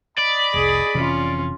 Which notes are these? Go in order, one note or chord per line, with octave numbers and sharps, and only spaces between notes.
D5 D#5 B5
F1 C2 G#4
F1 C3 E3 C#4 F4